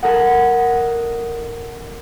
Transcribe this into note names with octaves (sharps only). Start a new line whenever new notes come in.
A4 A#4 D#5 F#5